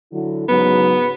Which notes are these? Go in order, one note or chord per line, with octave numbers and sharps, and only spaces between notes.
D3 F#3 E4
G#2 C#3 F#3 B3